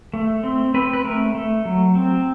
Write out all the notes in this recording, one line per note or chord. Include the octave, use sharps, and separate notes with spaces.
A3
C4
C4 B4
B4
A3 A#4
A3
F#3
C4